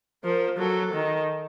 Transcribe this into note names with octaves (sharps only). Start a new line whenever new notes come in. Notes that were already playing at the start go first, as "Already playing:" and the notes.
F3 A#4
F#3 A4
D#3